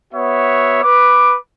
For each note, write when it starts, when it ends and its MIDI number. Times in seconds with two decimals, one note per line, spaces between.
0.14 0.79 59
0.14 0.79 66
0.14 0.79 73
0.14 0.79 76
0.83 1.36 71
0.83 1.36 86